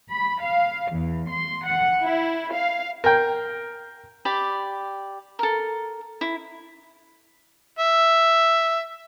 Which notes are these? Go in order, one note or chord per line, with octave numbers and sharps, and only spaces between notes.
B5
F5
E2
C6
F#5
E4
F5
A#4 G5
G4 D5 B5
A4 A#4
E4
E5